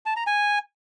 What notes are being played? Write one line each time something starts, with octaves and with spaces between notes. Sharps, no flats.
A5
A#5
G#5